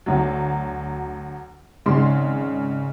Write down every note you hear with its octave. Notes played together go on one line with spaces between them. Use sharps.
D2 F#3
G#1 C#3 G#3 C6